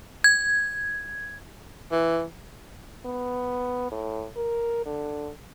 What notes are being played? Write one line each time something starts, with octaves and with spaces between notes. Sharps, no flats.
G#6
E3
B3
A2
A#4
D3